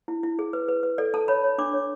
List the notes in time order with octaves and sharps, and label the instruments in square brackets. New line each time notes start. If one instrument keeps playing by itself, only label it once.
[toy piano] E4
E4
G#4
B4
B4
B4
A4 D5
A4 A5
C#5 B5
C#5
D4 D6
C#5